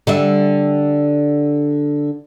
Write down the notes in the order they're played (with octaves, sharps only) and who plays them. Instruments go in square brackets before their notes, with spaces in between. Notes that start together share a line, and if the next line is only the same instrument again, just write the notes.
[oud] D3 G3 E5